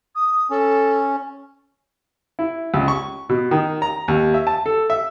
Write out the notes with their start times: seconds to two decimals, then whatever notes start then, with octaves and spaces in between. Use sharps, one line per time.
0.15 D#6
0.50 C#4 A4
2.39 E4
2.74 C#2
2.88 C#6
3.29 B2
3.51 D#3
3.82 A#5
4.08 D#2
4.34 E5
4.47 A5
4.66 A4
4.90 E5